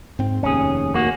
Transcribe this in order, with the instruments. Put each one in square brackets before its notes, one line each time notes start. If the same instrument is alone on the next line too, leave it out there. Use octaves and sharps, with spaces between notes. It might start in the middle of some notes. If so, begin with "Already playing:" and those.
[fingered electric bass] G#2 C4
[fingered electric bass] F1 D#2 [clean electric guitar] C#4 G#4
[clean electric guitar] A#3 F#4